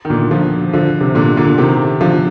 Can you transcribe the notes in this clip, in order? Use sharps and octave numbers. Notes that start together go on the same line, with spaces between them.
D#3
A#2 D3
D3 F3
D3 F3
C3
A#2 D3
A#2 D3
C3 D#3
D3 F3